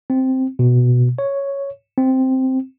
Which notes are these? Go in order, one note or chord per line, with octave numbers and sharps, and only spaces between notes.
C4
B2
C#5
C4